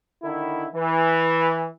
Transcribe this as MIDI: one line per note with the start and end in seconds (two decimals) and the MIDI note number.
0.23 0.67 50
0.23 0.67 51
0.23 0.67 64
0.75 1.69 52